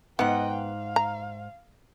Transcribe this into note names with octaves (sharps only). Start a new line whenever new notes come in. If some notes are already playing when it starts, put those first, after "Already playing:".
G#2 B3 D#5 F#5 G5
F5
A#5